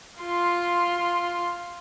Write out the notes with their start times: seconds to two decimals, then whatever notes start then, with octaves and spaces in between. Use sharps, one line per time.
0.20 F4 C6